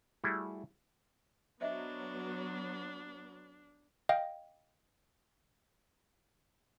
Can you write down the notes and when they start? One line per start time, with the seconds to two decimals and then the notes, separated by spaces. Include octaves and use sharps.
0.24 G3 A3 E4 F#4 G#4
1.61 F#3 B3 D4 C5 D#5 E5
4.09 D#5 F5 G5